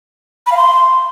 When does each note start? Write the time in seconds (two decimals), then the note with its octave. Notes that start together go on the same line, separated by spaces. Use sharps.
0.46 B5
0.52 F5
0.57 C6